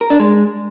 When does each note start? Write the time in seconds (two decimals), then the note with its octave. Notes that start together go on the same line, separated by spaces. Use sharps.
0.01 A#4
0.10 D4
0.20 G#3